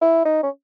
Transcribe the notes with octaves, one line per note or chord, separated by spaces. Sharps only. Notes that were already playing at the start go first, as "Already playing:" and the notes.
E4
D#4
C#4